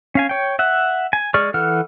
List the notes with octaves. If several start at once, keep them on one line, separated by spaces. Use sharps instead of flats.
C#4 F5 G#5
C#5 G5
E5 F#5
G#5
G#3 G#4 D5 C#6 F6
E3 A4 F#5 F6